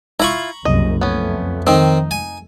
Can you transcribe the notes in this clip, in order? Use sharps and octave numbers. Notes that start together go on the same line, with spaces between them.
E4 F4 A#5 B5 C#6
F#1 C2 F#2 D#5
F2 A3 B3 C#4
D#3 C4 D#4
G#5